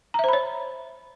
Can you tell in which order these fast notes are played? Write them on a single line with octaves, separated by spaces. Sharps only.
A#5 E5 C5 B5 C#5